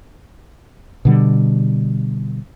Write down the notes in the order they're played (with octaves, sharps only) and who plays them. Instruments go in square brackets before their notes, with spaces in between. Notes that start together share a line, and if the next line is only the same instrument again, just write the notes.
[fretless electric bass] B2 D3 G3